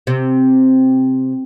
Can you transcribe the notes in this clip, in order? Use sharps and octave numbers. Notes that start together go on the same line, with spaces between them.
C3